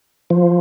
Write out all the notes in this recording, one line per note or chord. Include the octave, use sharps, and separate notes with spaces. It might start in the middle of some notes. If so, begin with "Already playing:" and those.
F3